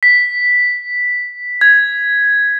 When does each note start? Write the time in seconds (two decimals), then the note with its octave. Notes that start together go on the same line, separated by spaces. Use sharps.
0.03 B6
1.61 G#6